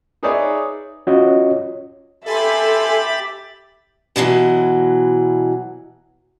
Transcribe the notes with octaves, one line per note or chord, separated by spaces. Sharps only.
D#4 G#4 B4 C#5 D5 E5
C#4 F4 F#4 C#5 D#5
G4 A4 E5 G#5 B5 C6 A6
B2 D3 E3 F#3